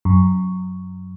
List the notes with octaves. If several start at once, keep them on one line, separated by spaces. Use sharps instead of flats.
F#2